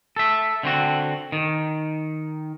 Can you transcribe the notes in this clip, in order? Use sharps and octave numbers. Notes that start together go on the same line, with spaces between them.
A4 E5
D3 C4 F#4
D#3